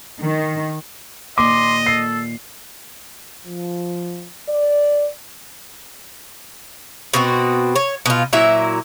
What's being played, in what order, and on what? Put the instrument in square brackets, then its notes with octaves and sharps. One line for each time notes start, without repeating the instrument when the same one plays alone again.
[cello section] D#3
[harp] A#2 D#3 [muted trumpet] D#5 [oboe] C6 [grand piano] D6
[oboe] A4 [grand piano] C7
[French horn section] F3
D5
[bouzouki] B2 C4 F#4
C#5
B2 F4
A#2 F#3 E4 E5